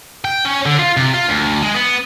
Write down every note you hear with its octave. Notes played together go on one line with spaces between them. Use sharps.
G5
C#4
D3
F4
C3
F4
D2
G#3
B3